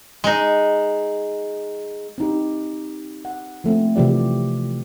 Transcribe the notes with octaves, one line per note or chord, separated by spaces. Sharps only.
G#3 D#4
C4 D#4 G4
F#5
F3 A3 A#3 C4
C3 E3 F3 G4 D5